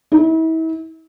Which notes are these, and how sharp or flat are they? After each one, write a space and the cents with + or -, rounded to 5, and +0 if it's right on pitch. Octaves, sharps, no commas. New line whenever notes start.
E4 -40